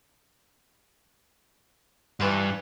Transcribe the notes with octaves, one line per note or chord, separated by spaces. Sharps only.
G2 E3 F4 F5